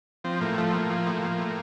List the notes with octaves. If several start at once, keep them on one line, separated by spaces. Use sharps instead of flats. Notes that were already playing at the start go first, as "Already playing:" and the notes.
F3 C4
A2 A#3
F3 A3
A2 A#3
F3
A2
F3
A2